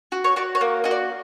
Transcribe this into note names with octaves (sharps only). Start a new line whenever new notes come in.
F#4
C#5
F#4 D5
C#5
A#3
F#4 D#5
D5